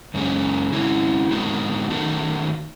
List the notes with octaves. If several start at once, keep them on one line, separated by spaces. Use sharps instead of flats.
F#2 C#3 G#3 C#4 G#4
C#3 G#3 C#4 E4
A2 G#3 B3 D#4 F#4
D#3 A3 D#4 F#4